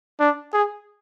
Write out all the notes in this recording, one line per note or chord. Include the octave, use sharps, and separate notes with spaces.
D4
G#4